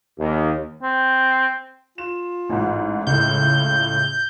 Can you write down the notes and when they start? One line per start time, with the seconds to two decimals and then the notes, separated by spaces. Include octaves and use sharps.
0.19 D#2
0.83 C4
1.98 F4 E7
2.49 A1 G#2
3.07 C#2 A2 C#3 G6